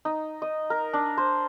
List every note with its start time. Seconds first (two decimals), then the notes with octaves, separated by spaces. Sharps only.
0.05 D#4
0.42 D#5
0.70 A#4
0.93 D4
1.18 C5